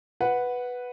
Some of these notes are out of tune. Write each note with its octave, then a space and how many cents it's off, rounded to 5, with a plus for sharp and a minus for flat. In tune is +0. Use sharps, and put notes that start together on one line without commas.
B4 +0 F#5 -5